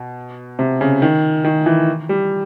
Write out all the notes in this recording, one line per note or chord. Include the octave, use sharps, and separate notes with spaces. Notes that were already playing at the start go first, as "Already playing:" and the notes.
Already playing: B2
C3
C#3
D#3
D#3
E3
G3